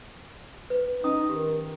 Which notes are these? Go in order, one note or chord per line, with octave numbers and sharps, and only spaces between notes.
B4
C#4 D#4 D#6
D#3 G4